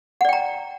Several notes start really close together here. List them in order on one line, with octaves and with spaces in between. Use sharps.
F#5 D5 G5 A#5